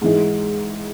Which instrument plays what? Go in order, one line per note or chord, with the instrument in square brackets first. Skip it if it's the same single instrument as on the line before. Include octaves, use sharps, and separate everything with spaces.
[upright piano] G#2 E3 G#3